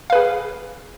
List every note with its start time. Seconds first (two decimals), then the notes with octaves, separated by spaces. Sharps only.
0.10 F5
0.13 B4
0.15 G#4